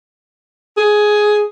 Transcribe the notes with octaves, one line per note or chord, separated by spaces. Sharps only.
G#4